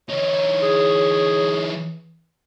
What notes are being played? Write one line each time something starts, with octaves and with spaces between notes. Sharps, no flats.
E3 D#4 C#5
G#4